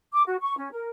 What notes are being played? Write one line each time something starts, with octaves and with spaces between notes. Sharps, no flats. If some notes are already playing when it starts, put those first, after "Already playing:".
D6
F#4
C#6
C#4
A#4